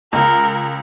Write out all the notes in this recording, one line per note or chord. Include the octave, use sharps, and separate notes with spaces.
C#2 A#4